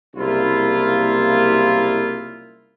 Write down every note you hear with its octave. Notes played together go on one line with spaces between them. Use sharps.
F#1 C2 A#3 E4 F4